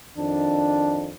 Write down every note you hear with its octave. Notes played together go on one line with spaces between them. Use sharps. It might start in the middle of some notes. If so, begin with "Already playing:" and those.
F2 D#3 D4